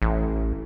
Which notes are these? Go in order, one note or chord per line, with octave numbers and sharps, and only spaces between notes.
A1